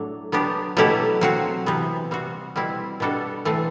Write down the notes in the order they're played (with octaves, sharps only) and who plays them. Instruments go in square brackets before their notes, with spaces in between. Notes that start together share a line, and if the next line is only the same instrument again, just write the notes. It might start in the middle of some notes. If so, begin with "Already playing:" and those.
Already playing: [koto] A2 F#3 A3 D4
F#3 B3 D4 G4
B2 F#3 A3 E4 G4
F#3 C4 F#4
C3 E3 B3
G3 C4 F#4
B2 G3 C4 E4
B2 G3 D4 F#4 A4
E3 A3 C4